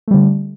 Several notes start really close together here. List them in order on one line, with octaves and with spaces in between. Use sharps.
A3 G3 D3